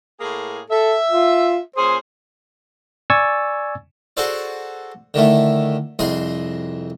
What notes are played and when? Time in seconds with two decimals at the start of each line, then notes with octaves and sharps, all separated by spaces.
0.20 A2 A#3 G#4
0.70 A4 E5
1.11 F4
1.76 A#2 C#4 G#4 C5
3.10 D5 G#5 C#6 E6 G#6 A6
4.17 F#4 G#4 A4 C5 D5
5.14 D3 D#3 A3 E4
5.99 C2 F2 G#4 D#5 C6 D#6